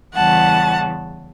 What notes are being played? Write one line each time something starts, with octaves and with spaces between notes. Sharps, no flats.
E2 C#3 E3 G3 F#5 A5